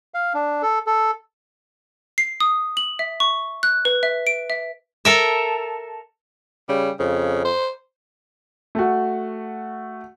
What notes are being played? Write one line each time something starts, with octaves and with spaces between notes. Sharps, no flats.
F5
D4
A4
A4
C7
D#6
F#7
E5
C#6
F#6
B4
E5
D7
E5
A4 A#4 E5
C#3 G3
F2 C#3
C5
A3 F#4